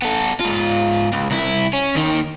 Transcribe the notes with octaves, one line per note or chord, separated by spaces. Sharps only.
B3 A4
G#2 F4
C#2
C2 E4
C#4
D#2 D#3